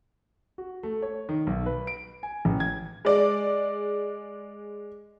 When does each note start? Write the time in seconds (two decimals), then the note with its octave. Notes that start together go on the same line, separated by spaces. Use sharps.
0.58 F#4
0.83 A3
1.02 C#5
1.29 D#3
1.47 B1
1.66 B4
1.87 D7
2.23 G#5
2.45 A1
2.60 G#6
3.05 G#3 D5